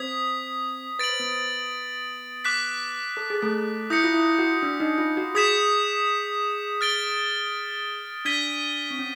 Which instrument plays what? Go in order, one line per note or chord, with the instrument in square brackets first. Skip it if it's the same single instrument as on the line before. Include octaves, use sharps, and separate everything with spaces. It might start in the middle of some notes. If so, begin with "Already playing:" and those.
Already playing: [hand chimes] C4 C5 [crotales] D#6 G#6 B6
[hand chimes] B4 [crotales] A6 D7 F#7
[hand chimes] C5
B3 B4
[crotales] D6 F#6 B6
[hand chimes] A4
G#4
A3 A4
[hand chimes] E4 [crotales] D#6 G6 A#6 C#7
[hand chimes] F4
E4
F#4
D4
D#4
F4
F#4
[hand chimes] G#4 [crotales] D#6 G#6 B6 E7
[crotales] F6 A6 D7 G7
[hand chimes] D4 [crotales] G#6 B6 D#7 G7
[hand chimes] C4
C#4